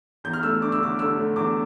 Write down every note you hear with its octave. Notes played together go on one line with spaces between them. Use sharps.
E2 G6
F6
A3 E6
D4 D6
E6
D3 D6
D3 E6
A3
E2 D6